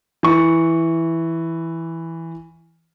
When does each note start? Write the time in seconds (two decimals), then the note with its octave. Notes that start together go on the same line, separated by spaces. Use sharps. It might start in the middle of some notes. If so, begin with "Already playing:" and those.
0.23 E3 C#6